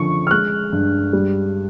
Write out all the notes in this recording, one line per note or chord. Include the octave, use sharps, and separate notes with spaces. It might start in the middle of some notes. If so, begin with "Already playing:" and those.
Already playing: D3 F3 C#6
F6
G#3 F#6
G2
G3